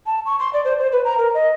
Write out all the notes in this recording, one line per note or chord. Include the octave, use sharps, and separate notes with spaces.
A5
C#6
C6
D5
C5
C5
B4
A#5
A#4
D#5